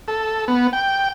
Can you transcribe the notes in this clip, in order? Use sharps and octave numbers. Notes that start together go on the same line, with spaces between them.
A4
B3
G5